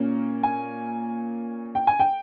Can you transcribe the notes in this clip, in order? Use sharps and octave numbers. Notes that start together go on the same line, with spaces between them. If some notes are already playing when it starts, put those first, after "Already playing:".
Already playing: A#2 A#3 C#4
G#5
G5
G#5
G5